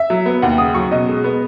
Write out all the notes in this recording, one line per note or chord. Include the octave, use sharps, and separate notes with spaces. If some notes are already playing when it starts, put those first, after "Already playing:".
Already playing: E5
F#3
B3
D#2 F#5
C#3 D#6
F#3 C#6
B2 D#5
G#3
B3